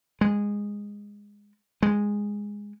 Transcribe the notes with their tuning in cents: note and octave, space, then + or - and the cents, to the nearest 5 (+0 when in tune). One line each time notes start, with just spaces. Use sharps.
G#3 -15
G#3 -10